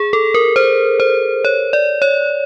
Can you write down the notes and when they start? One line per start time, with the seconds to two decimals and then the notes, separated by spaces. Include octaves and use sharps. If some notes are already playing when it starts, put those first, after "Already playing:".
Already playing: G#4
0.13 A4
0.34 A#4
0.56 C5
1.00 C5
1.45 C#5
1.73 D5
2.02 C#5